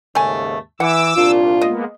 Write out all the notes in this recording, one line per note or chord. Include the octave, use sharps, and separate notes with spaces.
D#2 G#2 C#3 A3 G#5
E3 F#5 D6 E6
C2 A#2 D4 F4
G#3 A#3 B3 D#5